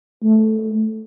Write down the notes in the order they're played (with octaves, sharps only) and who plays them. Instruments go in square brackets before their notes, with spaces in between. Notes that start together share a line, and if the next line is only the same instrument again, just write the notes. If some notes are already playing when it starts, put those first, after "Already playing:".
[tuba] A3